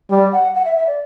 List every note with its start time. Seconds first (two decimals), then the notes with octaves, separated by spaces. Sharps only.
0.11 G3 D5
0.32 F#5
0.55 F#5
0.65 E5
0.76 E5
0.87 D5